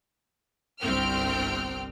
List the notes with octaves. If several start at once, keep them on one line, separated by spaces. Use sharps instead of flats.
G1 C2 C4 G5 F6